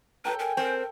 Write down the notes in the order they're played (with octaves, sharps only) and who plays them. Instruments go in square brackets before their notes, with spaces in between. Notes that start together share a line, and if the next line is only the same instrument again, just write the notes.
[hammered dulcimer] A4 G5 A5 [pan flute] B4 [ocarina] A#5
[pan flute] A#4 [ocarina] G#5
[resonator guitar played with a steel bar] C4 [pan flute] A#4